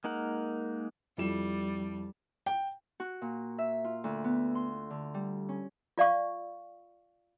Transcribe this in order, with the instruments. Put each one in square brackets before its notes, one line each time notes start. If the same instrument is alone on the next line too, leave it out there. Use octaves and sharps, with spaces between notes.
[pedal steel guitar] G#3 A#3 D#4 A#4 F#5
[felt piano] F2 E4 E7 [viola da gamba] G3
[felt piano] G5
[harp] F#4
A#2
E5
F4
D2
B3
C6
D3
G3
C#4
[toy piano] F4 D5 F5 C#6